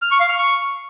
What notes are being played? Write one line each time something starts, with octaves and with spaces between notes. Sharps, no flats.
F6
C#6
F5
F6
C#6